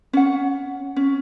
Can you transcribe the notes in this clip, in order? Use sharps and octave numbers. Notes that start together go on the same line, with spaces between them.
C#4 F#5
C#4